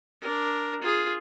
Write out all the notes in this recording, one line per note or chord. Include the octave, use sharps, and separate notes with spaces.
D4 A#4
F4 G#4